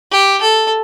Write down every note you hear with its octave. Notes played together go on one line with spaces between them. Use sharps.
G4
A4